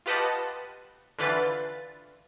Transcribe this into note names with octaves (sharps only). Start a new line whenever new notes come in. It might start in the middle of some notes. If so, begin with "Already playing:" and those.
F4 G4 B4 D#5 F#5 A5
D3 E3 F4 B4 A6